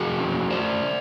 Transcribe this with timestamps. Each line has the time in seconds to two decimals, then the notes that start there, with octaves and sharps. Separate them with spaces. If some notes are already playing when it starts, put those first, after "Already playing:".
Already playing: F3 F#4 G#4
0.19 C#4
0.50 A3 C5 D5